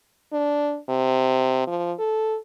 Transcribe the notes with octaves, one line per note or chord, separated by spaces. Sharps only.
D4
C3
F3
A4